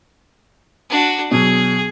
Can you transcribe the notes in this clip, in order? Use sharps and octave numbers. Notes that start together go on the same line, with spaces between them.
D4 F#4
B2 F#3 G#4